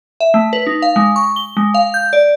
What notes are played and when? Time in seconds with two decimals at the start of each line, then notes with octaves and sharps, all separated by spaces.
0.20 E5
0.34 A3
0.53 B4
0.67 D#4
0.82 F5
0.96 G#3
1.16 C#6
1.36 G7
1.57 G#3
1.74 F5
1.94 G6
2.13 D5